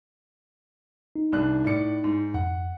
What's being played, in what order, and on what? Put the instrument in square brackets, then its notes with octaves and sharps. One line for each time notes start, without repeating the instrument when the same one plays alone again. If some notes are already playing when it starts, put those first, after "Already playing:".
[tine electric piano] D#4
[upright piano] C2 D4 F#6
A2 D5 C#7
G#2
[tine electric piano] F2 [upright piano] F#5